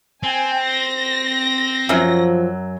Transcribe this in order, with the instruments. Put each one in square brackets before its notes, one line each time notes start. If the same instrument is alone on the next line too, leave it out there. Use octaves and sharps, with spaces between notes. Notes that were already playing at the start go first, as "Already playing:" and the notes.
[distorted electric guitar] C4 [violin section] G5 G#5
[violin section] A#6
[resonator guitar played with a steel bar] F#2 F#3 [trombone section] F3